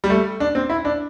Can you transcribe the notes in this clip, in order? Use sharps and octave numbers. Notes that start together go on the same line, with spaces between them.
G3
A3
D4
C4
E4
D4